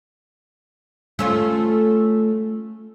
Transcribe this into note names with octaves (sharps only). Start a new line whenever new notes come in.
A3 C#4 F4